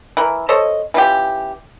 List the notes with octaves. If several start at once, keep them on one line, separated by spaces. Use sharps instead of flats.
E3 A#4
A4 C5 C#5 D#5
E3 C#4 F4 G4